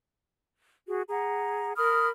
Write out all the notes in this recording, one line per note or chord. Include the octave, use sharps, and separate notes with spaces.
F#4 G#4
G#4 F#5 A#5
A#4 B5 D#6 F6